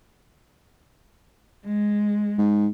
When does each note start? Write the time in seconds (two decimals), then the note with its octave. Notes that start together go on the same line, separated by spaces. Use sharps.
1.65 G#3
2.38 G#2